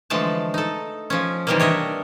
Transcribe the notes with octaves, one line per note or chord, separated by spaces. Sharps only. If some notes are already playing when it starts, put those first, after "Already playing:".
D3 E3 F3 G#3 A3 A5
D#4 A4
F3 C#4
C3 D#3 E3 G3 G#3 A#3
D4 C#5 D#5 E5